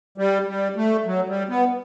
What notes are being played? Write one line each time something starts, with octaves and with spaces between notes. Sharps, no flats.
G3
G3
A3
F#3
G3
B3